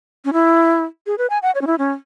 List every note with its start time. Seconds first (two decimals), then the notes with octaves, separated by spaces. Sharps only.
0.25 C#4
0.33 E4
1.07 G#4
1.18 B4
1.30 G#5
1.42 F#5
1.55 C#5
1.61 C#4
1.67 E4
1.79 C#4